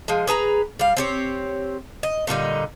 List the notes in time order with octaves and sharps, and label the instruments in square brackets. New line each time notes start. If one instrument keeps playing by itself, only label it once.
[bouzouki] F3 G#3
G#4 B4 A5 A#5
G3 F5
C4 G4 C#5
D#5
A#2 D3 G3 D#4